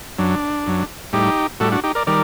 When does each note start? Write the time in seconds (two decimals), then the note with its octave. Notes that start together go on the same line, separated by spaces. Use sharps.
0.19 F#2 F#3 D4
0.67 F#2 F#3
1.13 A2 G3 D#4 G4
1.60 A2 G3 F#4 A4
1.72 D4 F#4
1.84 D#4 G4
1.95 A#4 D5
2.07 D#3 G3 A#4 D5